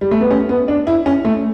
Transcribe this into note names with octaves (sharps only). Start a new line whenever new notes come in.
G3
A3
B3
C#4
B3
D4
E4
C#4
A3